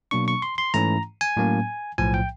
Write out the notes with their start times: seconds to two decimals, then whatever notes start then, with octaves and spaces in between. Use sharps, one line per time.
0.11 B2 F#3 A#3 D4 C#6
0.28 C#6
0.42 C6
0.58 C6
0.74 G#2 E3 A3 C#4 E4 A#5
1.21 G#5
1.37 A2 F#3 A#3 C#4
1.98 B1 A2 F3 G#5
2.14 G5